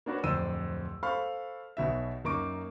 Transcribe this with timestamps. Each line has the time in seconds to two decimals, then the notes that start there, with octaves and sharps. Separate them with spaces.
0.06 A#3 D4 F#4 B4 C#5
0.23 D1 F2 C5 D5 E6 D#7
1.03 A4 C5 F5 B5 C#6 F6
1.77 B1 B2 E5
2.24 F#2 A#3 D#4 C#6 D6 D7